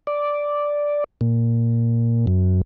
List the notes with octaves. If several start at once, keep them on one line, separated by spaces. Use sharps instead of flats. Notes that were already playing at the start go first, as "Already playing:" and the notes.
D5
A#2
F#2